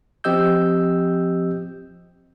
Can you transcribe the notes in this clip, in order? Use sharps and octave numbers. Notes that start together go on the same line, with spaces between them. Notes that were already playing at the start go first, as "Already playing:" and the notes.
F3 C4 G4 D#5 E6 G6